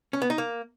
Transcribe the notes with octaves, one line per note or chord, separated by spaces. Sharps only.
C#4
B3
D#4
A#3